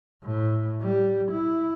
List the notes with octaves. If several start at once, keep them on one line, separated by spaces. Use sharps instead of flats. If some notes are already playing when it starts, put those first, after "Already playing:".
A2
G3
E4